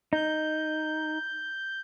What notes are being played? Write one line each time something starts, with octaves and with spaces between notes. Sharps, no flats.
D#4 G6